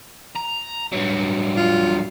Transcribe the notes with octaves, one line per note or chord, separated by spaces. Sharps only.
A#5
G2 F#3
F4